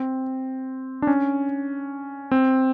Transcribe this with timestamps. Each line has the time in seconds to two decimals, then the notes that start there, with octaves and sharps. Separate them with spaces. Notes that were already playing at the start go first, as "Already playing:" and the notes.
Already playing: C4
1.02 D4
1.07 C#4
2.31 C4